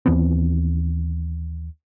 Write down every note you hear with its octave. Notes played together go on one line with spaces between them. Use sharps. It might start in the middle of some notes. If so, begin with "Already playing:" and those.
D#2 E3 B3 C4